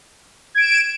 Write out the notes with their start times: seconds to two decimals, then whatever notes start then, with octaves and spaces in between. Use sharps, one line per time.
0.55 G#6
0.58 D7
0.60 E7